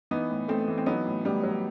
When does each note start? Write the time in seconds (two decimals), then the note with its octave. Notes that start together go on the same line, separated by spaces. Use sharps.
0.11 E3 B3 D#4
0.30 A2
0.48 A2 A3 C4
0.68 E3
0.78 C4
0.86 F#3 B3 D#4
1.06 A2
1.24 A2 G3 B3
1.44 F#3